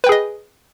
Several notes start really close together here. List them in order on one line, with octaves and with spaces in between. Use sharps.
B4 G5 G#4 D#5